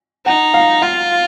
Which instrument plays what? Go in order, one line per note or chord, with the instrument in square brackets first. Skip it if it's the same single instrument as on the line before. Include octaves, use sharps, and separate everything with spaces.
[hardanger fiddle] D#4 [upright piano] F#5
[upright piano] F5
[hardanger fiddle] F4 [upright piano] F5